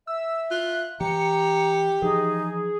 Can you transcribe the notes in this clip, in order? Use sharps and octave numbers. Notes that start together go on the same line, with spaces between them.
E5 E6
F4 F#6
E3 G4 A#5 C#7
E3 F3 D#4 G#4